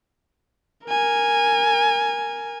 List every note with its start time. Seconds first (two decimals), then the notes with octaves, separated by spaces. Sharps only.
0.86 A#4 G#5